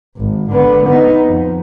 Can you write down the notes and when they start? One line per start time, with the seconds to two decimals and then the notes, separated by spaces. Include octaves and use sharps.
0.17 G#1
0.50 D3 B3
0.86 B3 D#4
1.25 F2